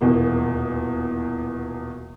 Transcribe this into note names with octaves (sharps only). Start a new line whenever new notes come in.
D#1 E2 B2 A#3